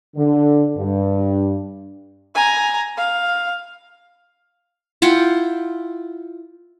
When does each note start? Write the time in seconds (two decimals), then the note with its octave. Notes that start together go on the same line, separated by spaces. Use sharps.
0.17 D3
0.77 G2
2.35 G#5 A#5
2.97 F5
5.02 E4 F4 F#5 G5